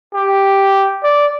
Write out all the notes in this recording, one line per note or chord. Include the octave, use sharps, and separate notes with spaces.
G4
D5